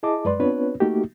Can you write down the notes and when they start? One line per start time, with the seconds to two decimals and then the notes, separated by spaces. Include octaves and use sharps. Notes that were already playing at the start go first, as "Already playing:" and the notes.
0.03 E4 G#4 D#5 A5 D6
0.25 F#2 G#3 B4 D5 C6
0.40 B3 C4 D4 F4 B4 C#5
0.80 A3 A#3 D#4 F#4 G4